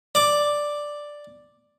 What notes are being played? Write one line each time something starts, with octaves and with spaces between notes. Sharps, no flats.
D5 D6